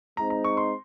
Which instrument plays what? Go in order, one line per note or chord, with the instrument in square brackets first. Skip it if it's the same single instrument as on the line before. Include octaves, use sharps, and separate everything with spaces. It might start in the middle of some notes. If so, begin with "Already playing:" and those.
[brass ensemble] G#3 C4 D#4 [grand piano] A#5
[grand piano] A#5
C#6
C6